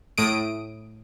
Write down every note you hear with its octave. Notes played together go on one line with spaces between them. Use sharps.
A2 D#6 D7